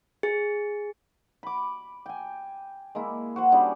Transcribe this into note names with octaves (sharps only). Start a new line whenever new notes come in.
G#4
B5 D6
G5 G#5
G#3 A#3 E4
F#4 C5 F#5
G3 C#4 D4 G#4